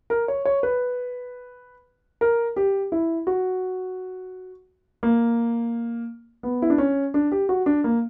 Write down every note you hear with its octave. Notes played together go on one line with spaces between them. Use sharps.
A#4
C#5
C#5
B4
A#4
G4
E4
F#4
A#3
B3
E4
D4
C#4
D4
G4
F#4
D4
A#3